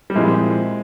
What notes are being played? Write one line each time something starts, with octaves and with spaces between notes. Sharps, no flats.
G3
A#2 F3 G#3 C4 E4 A#4